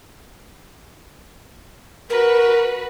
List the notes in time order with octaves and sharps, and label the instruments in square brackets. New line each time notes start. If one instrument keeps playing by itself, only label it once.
[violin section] F#4 B4 [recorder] A#4